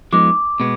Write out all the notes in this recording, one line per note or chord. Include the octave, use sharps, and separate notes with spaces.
F3 G#3 B3 D#4 D6
B2 G#3 B3